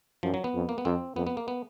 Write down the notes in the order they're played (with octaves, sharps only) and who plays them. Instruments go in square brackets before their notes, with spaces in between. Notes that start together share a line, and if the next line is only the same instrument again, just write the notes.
[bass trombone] F#2 [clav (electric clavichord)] F3
[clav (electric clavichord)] F#3
B3
[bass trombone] F2
[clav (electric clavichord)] A#3
B3
[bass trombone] F2 [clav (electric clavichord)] C4
[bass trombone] F2 [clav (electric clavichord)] B3
[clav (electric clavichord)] B3
A#3
B3